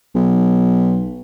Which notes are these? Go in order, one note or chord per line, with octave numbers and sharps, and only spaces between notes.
B1